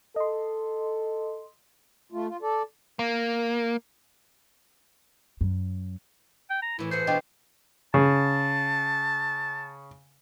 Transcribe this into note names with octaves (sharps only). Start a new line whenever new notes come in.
A4 D#5 C6
A3 F4
F4
A4 D5
A#3
F#2
G5
A#5
A2 E3 E4
G#4 B4 C5 F#5
B2 D4 F4 D#5 G5
C#3 A5